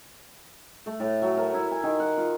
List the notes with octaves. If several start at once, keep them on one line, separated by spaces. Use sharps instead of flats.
A3
A2
F#3
A#4
E4
G#5
D#3
F#5
F4